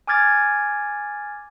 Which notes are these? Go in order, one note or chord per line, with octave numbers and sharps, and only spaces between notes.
G#5 D6 F6 G#6 A6